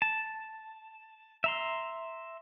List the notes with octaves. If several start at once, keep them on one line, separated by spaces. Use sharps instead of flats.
A5
E5 A#5 C6